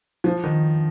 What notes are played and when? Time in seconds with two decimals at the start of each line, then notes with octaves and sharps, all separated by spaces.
0.24 F3
0.44 D#3